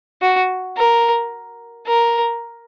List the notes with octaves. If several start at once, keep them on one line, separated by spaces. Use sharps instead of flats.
F#4
A#4
A#4